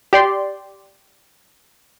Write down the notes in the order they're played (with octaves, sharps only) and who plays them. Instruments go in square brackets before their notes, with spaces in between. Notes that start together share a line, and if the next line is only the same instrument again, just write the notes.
[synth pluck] G4 D5 C6